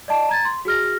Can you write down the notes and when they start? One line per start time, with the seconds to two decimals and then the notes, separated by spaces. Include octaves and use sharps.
0.08 D5 D#5 A5
0.29 A#5 G#6 A6
0.45 C6
0.65 F#4 G#4 F6 A#6